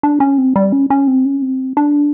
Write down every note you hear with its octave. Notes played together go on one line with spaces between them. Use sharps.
D4
C#4
C4
G3
C#4
C#4
C4
C#4
C4
D4